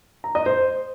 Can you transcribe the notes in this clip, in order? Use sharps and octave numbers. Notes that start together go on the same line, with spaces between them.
A#5
D#5
C5